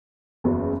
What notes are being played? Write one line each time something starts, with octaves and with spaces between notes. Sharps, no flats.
F#1 E2 C#3 F#3